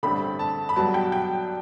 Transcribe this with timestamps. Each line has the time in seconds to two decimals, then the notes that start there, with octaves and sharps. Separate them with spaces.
0.03 A1 G2 D3 A3 C4 B5
0.39 A5
0.69 B5
0.76 G2 F#3 B3 A5
0.94 G5
1.12 G5